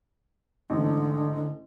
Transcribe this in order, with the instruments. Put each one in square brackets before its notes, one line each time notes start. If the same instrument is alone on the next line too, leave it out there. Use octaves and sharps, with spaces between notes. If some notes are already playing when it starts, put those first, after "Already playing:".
[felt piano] A1 G#2 [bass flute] D3